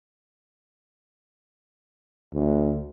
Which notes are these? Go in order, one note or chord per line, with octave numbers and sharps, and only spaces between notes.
D2